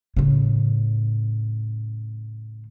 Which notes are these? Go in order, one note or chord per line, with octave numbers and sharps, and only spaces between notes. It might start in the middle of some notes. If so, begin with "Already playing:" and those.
A2 C#3